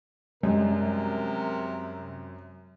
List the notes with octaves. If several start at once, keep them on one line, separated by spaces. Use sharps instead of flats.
F#2 C3 G3 G#3 A#4